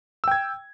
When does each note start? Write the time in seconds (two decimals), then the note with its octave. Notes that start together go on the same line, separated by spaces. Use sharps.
0.24 E6
0.28 G5
0.31 G#6